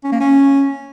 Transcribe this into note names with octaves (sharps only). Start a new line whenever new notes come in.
C#4
A#3
C#4